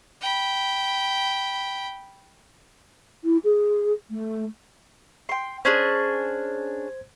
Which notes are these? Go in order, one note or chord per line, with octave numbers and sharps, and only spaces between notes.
G5 B5
E4
G#4
A3
G5 C6
C#4 D4 G#4 C5 G#6